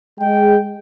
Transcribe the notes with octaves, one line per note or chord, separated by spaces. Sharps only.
G#3 G5